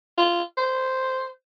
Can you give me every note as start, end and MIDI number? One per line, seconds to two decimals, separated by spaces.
0.18 0.42 65
0.57 1.26 72